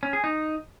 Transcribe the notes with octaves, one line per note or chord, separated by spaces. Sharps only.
C#4
G#4
D#4